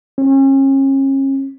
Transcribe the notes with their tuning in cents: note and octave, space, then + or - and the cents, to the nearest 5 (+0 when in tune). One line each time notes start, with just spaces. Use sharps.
C#4 -35